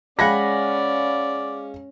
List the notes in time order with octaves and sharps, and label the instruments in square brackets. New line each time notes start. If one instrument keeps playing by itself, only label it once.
[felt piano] G#3 F5 A#6 [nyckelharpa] C#4 [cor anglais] D5 [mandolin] F#5 G#5 B5